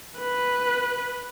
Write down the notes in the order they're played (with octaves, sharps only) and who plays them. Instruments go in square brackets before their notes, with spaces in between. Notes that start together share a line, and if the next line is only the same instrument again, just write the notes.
[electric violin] B4